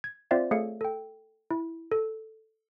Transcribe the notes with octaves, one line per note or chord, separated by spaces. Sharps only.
G#6
C4 F4 C5 D5 E5 F5
A3 G#4 A4 C#5 F5 C#7
A4 G5
E4
A4